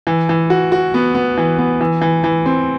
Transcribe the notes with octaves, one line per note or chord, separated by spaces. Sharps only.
E3
E3
F#4
F#4
B3
B3
E3
B3
E3
E3
E3
C4